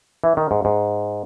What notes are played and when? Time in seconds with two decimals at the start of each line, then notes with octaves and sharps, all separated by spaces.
0.24 E3
0.37 D#3
0.51 G#2
0.65 G#2